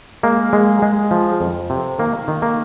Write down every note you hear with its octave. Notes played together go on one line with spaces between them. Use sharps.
G#3 A#3
G#3
G#3
F3
F2
C3
D#3 A#3
D#3
A#3